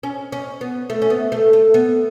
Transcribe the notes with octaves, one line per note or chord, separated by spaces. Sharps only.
C#4
C#4
B3
A3
C#4
B3
A3
A3
B3